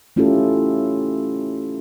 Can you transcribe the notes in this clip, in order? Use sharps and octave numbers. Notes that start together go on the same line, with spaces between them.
A3 C#4 E4 F4 G4 A4